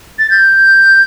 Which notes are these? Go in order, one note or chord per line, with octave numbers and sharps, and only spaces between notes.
A6
G6